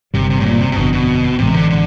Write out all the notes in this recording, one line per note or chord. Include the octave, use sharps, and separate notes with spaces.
G1 G2 C3 D#3 G3
C3
A2
A#2
C3
C3
G1 F2 B2 D3
B2
A1 A2 C3 E3 G#3
D3
D3